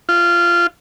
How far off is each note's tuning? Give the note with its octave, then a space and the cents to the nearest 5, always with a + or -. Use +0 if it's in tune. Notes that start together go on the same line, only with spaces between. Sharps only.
F4 -15